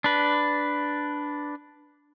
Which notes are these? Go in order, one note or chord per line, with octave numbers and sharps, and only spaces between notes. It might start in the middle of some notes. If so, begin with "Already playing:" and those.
D4 B4